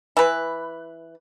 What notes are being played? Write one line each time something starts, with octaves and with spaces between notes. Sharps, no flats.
E3 B4